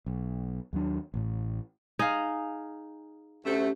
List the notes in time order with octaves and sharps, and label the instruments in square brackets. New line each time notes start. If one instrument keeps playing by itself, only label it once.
[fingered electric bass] B1
D#2 F#3 D4
A1 A2
[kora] D#4 [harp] G#4 F5
[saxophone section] D2 C3 A3 [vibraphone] C#4 G4